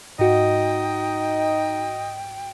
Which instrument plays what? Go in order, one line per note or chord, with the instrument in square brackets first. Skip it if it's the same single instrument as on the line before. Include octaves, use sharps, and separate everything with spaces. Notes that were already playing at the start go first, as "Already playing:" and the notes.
[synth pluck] G#2 F#4 [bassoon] D#4 [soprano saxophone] D#5 [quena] G5